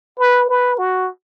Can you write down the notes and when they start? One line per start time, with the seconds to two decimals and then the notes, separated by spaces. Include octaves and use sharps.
0.20 B4
0.49 B4
0.78 F#4